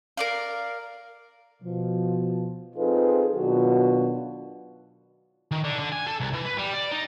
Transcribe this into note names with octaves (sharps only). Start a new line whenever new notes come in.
A#4 D5 F5
B2 F3
C4 D#4 F4 G#4 A4 B4
B2 D#3 F#3 D4 F4 F#4
D#3
D3
D3
G#5
A4
C2
E3
B4
G3
D5
D#4